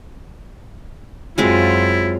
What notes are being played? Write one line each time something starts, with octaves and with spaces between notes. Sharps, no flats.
F#2 F#3 G#3 C4 E4 F4